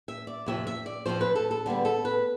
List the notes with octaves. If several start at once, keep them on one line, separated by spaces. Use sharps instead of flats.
E5
D5
F2 C3 F3 E5
E5
D5
F2 C3 F3 C5
B4
A4
A4
D3 G3 B3
A4
B4